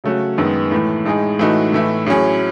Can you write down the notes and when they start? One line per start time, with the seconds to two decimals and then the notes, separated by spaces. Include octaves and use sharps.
0.04 C#3 F#3 A3 C#4 F#4
0.38 F#2 D#3 G#3 B3
0.71 A2 E3 A3
1.05 A2 G#3 D#4 G#4
1.39 A2 E3 A3 D#4 F#4
1.72 A2 E3 A3 E4
2.06 A2 F#3 C#4 G#4